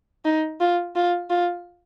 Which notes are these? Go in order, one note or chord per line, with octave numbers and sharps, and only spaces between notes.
D#4
F4
F4
F4